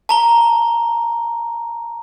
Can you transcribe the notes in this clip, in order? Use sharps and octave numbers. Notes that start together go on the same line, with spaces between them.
A5 A#5 G7